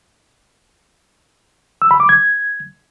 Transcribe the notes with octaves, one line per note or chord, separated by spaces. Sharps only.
E6
B5
D6
G#6